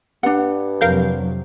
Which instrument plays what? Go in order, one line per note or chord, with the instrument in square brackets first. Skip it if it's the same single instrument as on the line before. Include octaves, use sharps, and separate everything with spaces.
[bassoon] G2 [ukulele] D4 F#5
[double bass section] F2 C3 F#3 [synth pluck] A#4 F5 G6